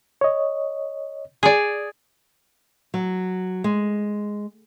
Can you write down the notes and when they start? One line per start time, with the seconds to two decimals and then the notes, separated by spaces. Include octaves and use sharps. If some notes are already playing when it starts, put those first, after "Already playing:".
0.21 C#5 D#5
1.43 G#4 D5
2.94 F#3
3.64 G#3